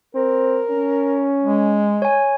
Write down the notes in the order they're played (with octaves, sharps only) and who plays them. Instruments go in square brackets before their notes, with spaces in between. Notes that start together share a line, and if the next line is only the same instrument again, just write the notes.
[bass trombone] C4 [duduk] A#4
[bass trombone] C#4
[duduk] G#3
[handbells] C#5 G#5